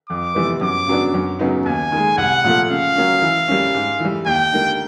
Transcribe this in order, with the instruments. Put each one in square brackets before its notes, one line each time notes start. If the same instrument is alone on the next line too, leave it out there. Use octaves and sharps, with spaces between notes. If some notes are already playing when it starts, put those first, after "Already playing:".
[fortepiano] F2 [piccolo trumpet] D6
[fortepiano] C3 E3 G3 B3
[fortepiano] F#2 [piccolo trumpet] D6
[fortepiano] C#3 F#3 B3 D4
F#2
C#3 F#3 B3 D#4
[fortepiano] D#2 [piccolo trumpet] G#5
[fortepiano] D#3 G#3
[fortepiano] C2 [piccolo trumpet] F#5
[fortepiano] A#2 F3 A3
[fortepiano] C#3 [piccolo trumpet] F5
[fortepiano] F#3 A#3 C#4
E3
G3 A#3 C#4
G#2
E3 G3
[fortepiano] D#2 [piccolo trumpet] G5
[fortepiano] D3 G3 A#3 D#4